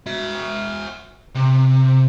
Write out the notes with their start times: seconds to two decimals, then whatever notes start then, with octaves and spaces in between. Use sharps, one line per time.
0.07 F#4 E5
1.35 C3